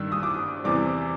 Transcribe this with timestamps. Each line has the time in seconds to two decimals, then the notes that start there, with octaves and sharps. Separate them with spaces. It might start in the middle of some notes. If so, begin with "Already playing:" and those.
Already playing: G2 D#3 G3 E6
0.12 D#6
0.23 D6
0.64 E2 C3 E3 G3 D6